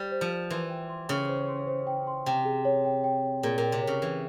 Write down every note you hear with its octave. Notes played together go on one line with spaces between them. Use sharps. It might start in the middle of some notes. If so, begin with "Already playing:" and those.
Already playing: G3 C5
C5
F3
C5
E3 C6
G5
C6
C#3 G5
C5
C6
C5
G5
C6
C3 G5
G#4
C#5
G5
G5
C#5
A#2 G#4
A#2 G5
C3
C#5
C#3
E3 G#4